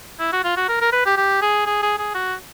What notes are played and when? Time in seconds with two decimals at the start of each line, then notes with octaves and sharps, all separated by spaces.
0.19 E4
0.33 F#4
0.44 F4
0.57 F#4
0.69 A#4
0.81 A#4
0.92 B4
1.06 G4
1.17 G4
1.42 G#4
1.66 G#4
1.83 G#4
1.98 G#4
2.15 F#4